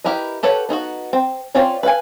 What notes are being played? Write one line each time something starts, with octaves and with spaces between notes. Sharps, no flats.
E4 G4 A#4 B4 D#5
G4 A4 B4 C#5 F#5
B3 D#4 E4 F#4
C4
C4 C#4 F4 C#5 D5
B4 F5 F#5 G#5